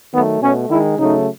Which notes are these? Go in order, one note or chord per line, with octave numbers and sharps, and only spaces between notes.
D#3 F#3 A3 B3
B2 A3 C#4
D#3 G#3 E4
C#3 F#3 A3 D#4